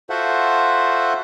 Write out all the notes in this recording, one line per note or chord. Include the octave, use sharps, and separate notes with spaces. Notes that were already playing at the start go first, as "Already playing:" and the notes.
F4 F#4 A4 C5 E5 F#5